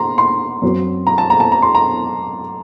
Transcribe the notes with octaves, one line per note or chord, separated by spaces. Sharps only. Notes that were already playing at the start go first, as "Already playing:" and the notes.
Already playing: A#5 C6
C6
F#2 F#3 C4
A#5
A5
A#5
A5
A#5
C6
A#5